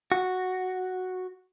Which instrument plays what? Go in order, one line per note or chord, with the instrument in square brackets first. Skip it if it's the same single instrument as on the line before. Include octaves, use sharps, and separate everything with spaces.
[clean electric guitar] F#4